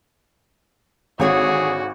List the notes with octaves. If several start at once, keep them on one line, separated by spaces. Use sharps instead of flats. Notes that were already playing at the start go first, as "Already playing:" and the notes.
G#1 D3 F#4 G#4 C#5 G#5